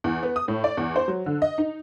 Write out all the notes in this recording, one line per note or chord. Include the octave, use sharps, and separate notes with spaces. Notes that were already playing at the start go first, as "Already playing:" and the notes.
E2
B3
D#6
A2
D5
E2
C5
F#3
D3
D#5
D#4